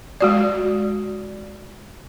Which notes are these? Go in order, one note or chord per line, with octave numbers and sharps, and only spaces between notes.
G#3 F#4 D5